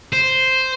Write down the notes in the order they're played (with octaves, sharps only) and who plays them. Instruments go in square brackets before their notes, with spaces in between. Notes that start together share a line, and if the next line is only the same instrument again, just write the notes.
[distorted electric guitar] C5